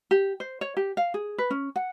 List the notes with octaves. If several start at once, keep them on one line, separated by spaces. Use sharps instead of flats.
G4
C5
C#5
G4
F5
G#4
B4
C#4
F#5